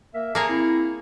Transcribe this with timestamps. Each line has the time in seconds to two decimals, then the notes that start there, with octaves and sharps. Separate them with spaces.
0.14 A#3 A#4 E5
0.35 A#3 G#4 C#5 A5 A#5
0.49 C4 E4